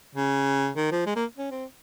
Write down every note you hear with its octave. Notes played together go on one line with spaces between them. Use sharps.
C#3
D#3
F3
G#3
A#3
C#4
C4